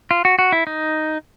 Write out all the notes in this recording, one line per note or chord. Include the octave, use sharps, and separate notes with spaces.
F4
F#4
F#4
E4
D#4